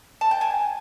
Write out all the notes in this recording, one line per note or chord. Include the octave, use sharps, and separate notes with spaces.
A5
G5
G#5